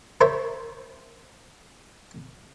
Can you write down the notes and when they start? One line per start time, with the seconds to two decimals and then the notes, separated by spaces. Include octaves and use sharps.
0.21 A#4 C5 C#5 E5